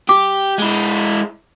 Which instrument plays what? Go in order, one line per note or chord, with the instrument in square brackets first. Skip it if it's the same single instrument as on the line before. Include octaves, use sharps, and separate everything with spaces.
[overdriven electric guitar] G4 [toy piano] D6
[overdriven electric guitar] G#3 E4